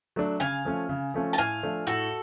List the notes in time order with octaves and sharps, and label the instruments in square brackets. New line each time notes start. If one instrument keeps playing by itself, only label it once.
[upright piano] F#3 A3 D4
[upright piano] C#3 [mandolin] F5 G#5
[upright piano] F3 A3 C#4
C#3
F3 A3 C#4
[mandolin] A5
[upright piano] A2 [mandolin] F5 G#5
[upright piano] F3 A3 D4
[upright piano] A2 [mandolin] F#4 A4